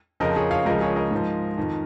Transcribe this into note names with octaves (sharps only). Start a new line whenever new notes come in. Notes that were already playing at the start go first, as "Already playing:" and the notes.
F2 C#3 F3 A#4 D#5
G#4 C#5
C#5 F5
C#2 C#3 F3 A#4 D#5
G#4 C#5
A#4 D#5
G#2 F3
F2 D#3